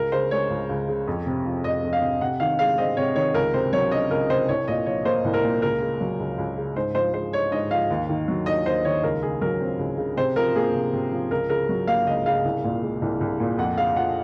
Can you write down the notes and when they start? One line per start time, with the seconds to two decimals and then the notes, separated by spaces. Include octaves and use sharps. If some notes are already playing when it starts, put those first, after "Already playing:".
Already playing: C#2 A#4
0.12 C#3 C5
0.31 G#3 C#5
0.50 C#2
0.69 C#2
0.88 C#3
1.07 F2
1.26 C3
1.45 F3
1.64 F2 D#5
1.83 F2
1.93 F5
2.01 C3
2.21 C3 F#5
2.40 D#3 F5
2.59 G#3 F5
2.78 C4 D#5
2.97 C3 C#5
3.15 D#3 C#5
3.34 C#2 A#4
3.54 C3 C5
3.73 F#3 C#5
3.91 C#4 D#5
4.11 C#2 A#4
4.30 C3 C5
4.48 C2 C#5
4.68 A#2 D#5
4.86 F3 C#5
5.05 A#3 C5
5.24 C2
5.34 A#4
5.44 A#2
5.62 C#2 A#4
5.81 C#3
6.01 F#3
6.19 C#2
6.38 C#2
6.57 C#3
6.76 G#2 C5
6.95 F3 C5
7.13 G#3 C5
7.33 D#4 C#5
7.52 G#2 D#5
7.71 F3 F5
7.90 D#2
8.09 D#3
8.28 F#3
8.46 D#2 D#5
8.66 D#2 C5
8.85 D#3 C#5
9.03 C#2 A#4
9.22 C#3 G#4
9.41 F#3 A#4
9.61 C4
9.79 C#2
9.98 C#3
10.17 C3 C5
10.36 F3 A#4
10.56 A#3 G#4
10.74 C3
10.93 C3
11.12 F3
11.31 C#2 A#4
11.49 C#3 A#4
11.69 F#3
11.87 A#3 F5
12.07 C#2 D#5
12.26 C#3 F5
12.44 C2
12.64 A#2
12.83 G#3
13.02 C2
13.21 C2
13.40 A#2
13.58 F2 F#5
13.77 C#3 F5
13.96 F3 F#5